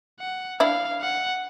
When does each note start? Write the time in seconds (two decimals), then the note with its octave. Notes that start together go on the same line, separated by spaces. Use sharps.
0.20 F#5
0.60 D4 E4 F5
1.01 F#5